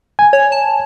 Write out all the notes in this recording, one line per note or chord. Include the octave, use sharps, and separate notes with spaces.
G#5
C#5
A5